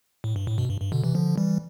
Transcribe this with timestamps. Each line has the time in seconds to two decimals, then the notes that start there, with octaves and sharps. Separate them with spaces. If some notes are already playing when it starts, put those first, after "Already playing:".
0.24 A2
0.36 G2
0.47 A2
0.58 G2 B2
0.69 G2
0.81 G2
0.92 B2 D3
1.04 C3 E3
1.15 D3 F3
1.38 E3 G3